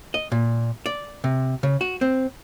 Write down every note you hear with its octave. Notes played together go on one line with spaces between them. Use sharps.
D#5
A#2
D5
C3
C#3
F#4
C4